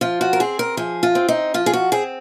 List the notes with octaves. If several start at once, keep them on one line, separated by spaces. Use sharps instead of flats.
F3 F4
F#4
A#4
C4 G#4
A#4
F3 G#4
F4
C4
D#4
F3 F4
G#4
F#4
C4 G#4